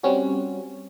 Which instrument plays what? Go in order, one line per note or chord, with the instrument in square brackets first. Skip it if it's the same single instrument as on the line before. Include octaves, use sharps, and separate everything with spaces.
[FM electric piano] G3 C4 C#4 F#4